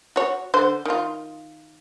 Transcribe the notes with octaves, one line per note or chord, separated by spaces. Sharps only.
F#4 C#5
D3 C5
D#3 F4